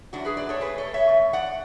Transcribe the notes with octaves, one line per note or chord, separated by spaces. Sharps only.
F#2 E3 A3 D4 F#4
G#4 B4
B4 D5
A4 C#5
B2 A3 G#4 B4
A4 C#5
C#5 E5
E2 B2
D5 F#5